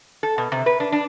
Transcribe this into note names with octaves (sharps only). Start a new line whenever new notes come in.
A4
B2
C3
B4
D4
D4